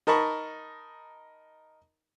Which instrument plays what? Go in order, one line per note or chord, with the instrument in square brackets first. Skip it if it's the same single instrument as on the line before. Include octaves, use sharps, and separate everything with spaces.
[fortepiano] D#4 A#4 A5 B5 C#6